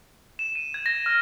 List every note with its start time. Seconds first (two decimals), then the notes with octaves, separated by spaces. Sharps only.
0.39 E7
0.55 D#7
0.74 G#6
0.86 A#6
1.06 F6